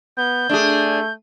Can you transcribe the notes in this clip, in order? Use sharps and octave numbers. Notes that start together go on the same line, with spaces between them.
B3 G6
A3 D4 G#4